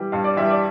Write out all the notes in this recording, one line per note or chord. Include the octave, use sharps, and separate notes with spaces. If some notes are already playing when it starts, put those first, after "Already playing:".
Already playing: E3 G3
G2 F5
D5
E3 G3 E5
D5